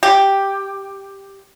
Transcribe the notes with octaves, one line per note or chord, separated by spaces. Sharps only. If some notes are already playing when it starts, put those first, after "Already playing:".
G4